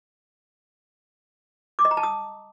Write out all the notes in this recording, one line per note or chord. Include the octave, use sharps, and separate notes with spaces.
D6
D#5
A#5
A5
D#6